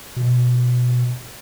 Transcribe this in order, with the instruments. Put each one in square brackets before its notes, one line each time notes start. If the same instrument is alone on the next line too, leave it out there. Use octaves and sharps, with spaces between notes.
[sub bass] B2